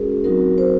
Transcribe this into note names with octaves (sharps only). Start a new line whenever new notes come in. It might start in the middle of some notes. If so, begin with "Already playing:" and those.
Already playing: G#3 C#4 F#4 G#4 A#4
F#3 C4 D#4 F#4 A#4
C5